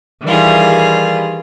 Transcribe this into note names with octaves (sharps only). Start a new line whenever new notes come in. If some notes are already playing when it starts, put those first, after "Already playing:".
D#3 E3 G3 F4 G#4